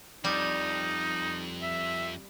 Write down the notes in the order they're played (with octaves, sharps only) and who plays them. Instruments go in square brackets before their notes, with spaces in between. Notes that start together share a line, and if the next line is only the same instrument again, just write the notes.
[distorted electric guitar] F2 [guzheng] G3 [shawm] D#4
[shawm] E5